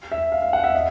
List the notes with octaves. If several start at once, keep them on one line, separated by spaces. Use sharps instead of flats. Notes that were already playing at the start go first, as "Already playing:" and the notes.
E5
F5
F5
F#5
E5
D#5